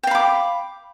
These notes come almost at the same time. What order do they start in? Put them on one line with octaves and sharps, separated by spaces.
G5 F5 B5 D6